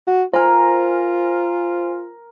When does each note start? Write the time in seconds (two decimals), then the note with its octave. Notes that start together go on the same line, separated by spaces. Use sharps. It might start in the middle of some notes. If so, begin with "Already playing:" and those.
0.07 F#4
0.34 F4 A#4 C5 G#5 A#5